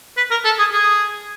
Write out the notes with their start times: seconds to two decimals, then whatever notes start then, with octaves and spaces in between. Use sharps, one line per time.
0.17 B4
0.31 A#4
0.45 A4
0.59 G#4
0.72 G#4